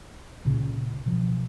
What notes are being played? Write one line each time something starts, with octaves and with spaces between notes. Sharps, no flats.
C#2 A#2 C#3
B2 F3